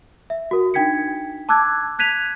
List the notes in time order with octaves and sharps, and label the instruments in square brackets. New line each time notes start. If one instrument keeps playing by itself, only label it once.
[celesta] E5
F#4 A#4
D4 D#4 G5 G#6 B6 C#7
A5 D6 E6 F#6 G#6
F#6 G#6 B6 D#7 F7